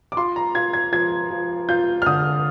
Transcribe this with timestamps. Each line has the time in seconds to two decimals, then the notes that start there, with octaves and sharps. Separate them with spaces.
0.12 D6
0.17 F4 C6
0.36 A#5
0.55 F4 G#6
0.73 G#6
0.92 F3 G#6
1.31 F3
1.69 F4 G6
2.02 F6
2.06 D3 D#6